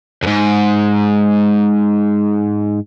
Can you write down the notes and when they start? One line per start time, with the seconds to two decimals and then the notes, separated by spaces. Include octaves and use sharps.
0.23 F2 G#2